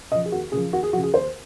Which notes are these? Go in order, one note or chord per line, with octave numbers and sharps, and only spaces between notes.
C#3 F3 D#5
G#4
D#2 F#4
C#3 F3 G#4
D#2 F#4
G#4
C#3 F3 F#4
G#4
D#2 C5